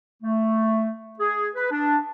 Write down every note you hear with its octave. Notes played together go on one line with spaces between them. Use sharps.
A3
G#4
B4
D4